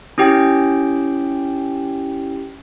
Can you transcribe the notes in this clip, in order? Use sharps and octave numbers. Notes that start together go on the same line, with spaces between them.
C#4 E4 G4 G5